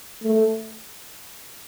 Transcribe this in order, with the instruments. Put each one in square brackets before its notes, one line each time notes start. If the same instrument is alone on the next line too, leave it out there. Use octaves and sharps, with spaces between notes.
[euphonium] A3